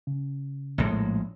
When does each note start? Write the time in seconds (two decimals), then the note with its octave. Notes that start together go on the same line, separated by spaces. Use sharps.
0.07 C#3
0.78 A#1 A2 G#3